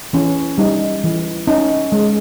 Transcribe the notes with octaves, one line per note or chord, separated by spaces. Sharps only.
E3 C#4
G3 D#4
E3
C#4 D#4
G#3